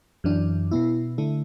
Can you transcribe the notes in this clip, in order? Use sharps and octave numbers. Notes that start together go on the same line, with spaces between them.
F#2 E3 D4
B2 B3 E4
D3 A3 E4